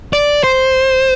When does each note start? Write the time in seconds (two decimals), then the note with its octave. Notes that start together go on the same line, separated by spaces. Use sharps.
0.13 D5
0.44 C5